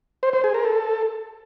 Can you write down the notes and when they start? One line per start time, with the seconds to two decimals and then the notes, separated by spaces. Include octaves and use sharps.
0.23 C5
0.33 C5
0.44 G#4
0.54 A#4
0.65 A4